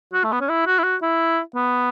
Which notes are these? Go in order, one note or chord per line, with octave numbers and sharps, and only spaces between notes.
F#4
A3
B3
C#4
E4
F#4
E4
F#4
E4
B3